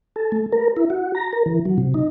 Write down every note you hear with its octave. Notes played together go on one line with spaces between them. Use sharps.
A4
A3
A#4
E4
F#4
A#5
A#4
E3
F#3
C3
D#4